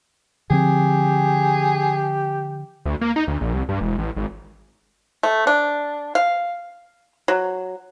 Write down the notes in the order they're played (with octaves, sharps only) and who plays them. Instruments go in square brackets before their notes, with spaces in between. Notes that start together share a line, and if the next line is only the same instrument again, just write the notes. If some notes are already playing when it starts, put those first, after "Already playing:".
[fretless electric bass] D3 F3 C4 [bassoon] G4 [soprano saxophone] G#4
[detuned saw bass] D2
A#3
D#4
D2
A#1
C2
G2
E1
A1
G#1
[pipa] A3
D4
F5
F#3